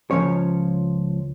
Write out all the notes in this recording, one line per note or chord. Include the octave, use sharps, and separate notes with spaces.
C#2 F3 C#4 C#5